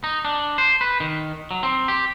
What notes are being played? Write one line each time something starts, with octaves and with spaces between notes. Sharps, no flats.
D#4
D4
C5
B4
D#3
F#3
C4
G4